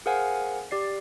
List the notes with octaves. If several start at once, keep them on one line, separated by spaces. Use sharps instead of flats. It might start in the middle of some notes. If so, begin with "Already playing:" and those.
G#4 A#4 C5 F5 F#5 G#5
G4 D5 C7